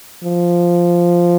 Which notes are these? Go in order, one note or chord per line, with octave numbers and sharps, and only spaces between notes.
F3